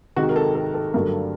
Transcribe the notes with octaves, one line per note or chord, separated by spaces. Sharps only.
C3 D#3 G#3 F#4
A#4
A4
A4
A4
G2 D3 F#3 A3 A#4